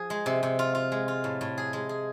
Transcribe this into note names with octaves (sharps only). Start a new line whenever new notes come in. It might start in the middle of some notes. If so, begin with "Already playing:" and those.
Already playing: F3 G#4
G#3
C3
C3
F4
F4
G#3
F4
A2
A2
G#4
G#3
G#4